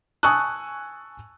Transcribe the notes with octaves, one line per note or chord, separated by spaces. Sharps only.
G#5 A5 C#6 D#6 E6 F#6